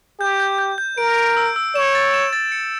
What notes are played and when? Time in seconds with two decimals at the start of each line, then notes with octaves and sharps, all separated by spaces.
0.20 G4 G6
0.40 G6
0.58 G6
0.78 G6
0.98 A#4 D7
1.17 D7
1.37 E6
1.56 E6
1.75 C#5 E7
1.95 A6
2.14 E7
2.33 A6
2.52 C#7